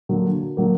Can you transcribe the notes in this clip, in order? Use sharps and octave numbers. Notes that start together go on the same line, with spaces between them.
D3 F#3 A#3
D3 F#3 A#3